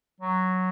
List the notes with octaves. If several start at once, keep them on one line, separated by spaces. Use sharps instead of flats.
F#3